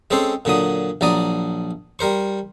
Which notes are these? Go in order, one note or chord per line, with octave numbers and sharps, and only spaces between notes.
G#3 C4 C#4 A4 C5
A#2 D3 F#3 D#6
A#1 F#3 D5 A#5 D#6
G3 A#4 C5 C#6